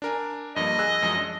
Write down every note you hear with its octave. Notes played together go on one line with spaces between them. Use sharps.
D4 A#4 G#5
G2 F3 A#3 D#5
G#4 E6 F#6
F#2 F3 G#3
D4